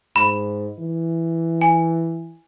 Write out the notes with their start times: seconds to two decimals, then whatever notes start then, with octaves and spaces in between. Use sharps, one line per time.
0.16 G#2 B5
0.79 E3
1.61 G#5